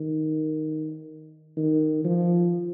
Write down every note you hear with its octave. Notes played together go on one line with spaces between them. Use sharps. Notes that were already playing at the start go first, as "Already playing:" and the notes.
Already playing: D#3
D#3
F3